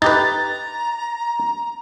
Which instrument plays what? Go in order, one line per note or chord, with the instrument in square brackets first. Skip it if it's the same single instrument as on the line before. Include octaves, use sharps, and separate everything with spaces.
[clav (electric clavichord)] D#4 G4 B4 [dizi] A#5 [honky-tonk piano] A6